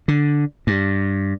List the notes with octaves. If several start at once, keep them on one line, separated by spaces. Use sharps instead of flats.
D3
G2